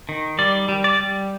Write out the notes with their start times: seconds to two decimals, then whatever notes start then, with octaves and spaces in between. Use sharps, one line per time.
0.09 D#3
0.39 G3 D5
0.69 G3
0.84 D5
1.00 G3